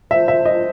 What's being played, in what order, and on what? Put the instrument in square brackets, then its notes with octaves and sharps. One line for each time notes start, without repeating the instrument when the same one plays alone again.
[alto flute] C5 [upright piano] E5
[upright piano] E5
D#5